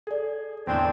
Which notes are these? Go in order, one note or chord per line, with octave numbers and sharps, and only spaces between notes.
G#4 A4 D5
E2 A2 D3 C4 D4